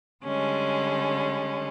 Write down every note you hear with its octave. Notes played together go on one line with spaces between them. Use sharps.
D3 G3 G#3 C#4